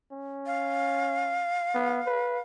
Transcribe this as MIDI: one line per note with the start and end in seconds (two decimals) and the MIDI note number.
0.12 1.50 61
0.46 2.41 77
1.75 2.01 59
2.06 2.39 71